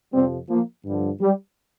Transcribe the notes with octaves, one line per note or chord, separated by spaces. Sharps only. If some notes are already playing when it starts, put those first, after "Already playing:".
F2 C3 F3 G3 C4
F3 A#3
G2 D3 F3 G3
G3